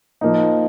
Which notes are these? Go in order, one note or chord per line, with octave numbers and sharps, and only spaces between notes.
F3 A#3 D#4